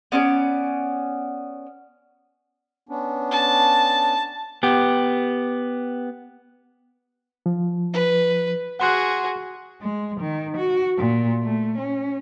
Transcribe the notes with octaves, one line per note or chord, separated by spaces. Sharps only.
B3 C#4 D5
B3 C#4 D4
A5
B3 G4
F3
B4
F#4 G#4 F#5 C6 F#6
G#3
D#3
F#4
A#2
A3
C#4